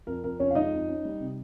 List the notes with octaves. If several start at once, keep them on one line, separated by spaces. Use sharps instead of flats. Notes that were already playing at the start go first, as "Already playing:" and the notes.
F2 A#4
F2 A#4
F2 C#4 C#5
F5
G#3 D#4 D#5
F2
C#4
G3
C3